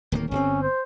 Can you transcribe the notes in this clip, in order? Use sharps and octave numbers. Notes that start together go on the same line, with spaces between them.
D1 D#3 A#3
G1 C#3 C4 C#4
C5